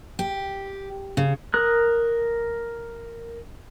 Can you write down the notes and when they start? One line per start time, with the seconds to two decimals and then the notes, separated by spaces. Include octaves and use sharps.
0.19 G4
1.17 C#3
1.54 A#4 D#6 F#6